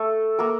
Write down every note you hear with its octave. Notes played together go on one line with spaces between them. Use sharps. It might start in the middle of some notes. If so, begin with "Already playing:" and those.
Already playing: A3 A4
A#3 A#4